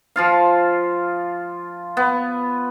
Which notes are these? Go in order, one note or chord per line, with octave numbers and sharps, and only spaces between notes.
F3 F4 F5
B3